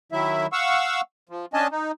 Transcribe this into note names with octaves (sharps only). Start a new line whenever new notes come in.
D#3 F#3 E4 E5
F5 F#5 C#6 E6
F3
C#4 D4 D#5 G#5 A5
D#4